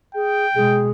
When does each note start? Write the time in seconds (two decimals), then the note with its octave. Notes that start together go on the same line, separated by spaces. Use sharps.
0.15 G#4 G5
0.56 B2 G#3 G#4